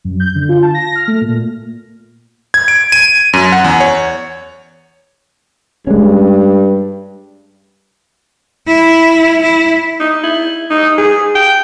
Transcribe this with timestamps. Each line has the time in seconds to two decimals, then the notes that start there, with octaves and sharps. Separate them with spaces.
0.04 F#2
0.20 G6
0.35 D3
0.49 F4
0.62 A5
0.74 A#6
0.96 F6
1.08 A3
1.21 A#2
2.54 G#6
2.68 D7
2.92 D#7
3.33 F#2
3.52 F#5
3.64 E2
3.80 C#5
5.87 G2 G#3 C#4
8.67 E4
9.42 E4
10.00 D#4
10.23 E4
10.70 D#4
10.98 G#4
11.35 G5